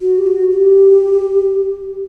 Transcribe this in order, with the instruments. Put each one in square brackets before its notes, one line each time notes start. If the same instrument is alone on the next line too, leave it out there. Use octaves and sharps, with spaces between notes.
[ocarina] F#4
G4
F#4
G4